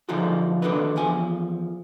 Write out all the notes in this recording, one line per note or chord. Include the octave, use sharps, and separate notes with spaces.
D3 F3 D#4 F4 F#4 G#4
D#3 D4 F#4 A4 B4
E2 F3 G#5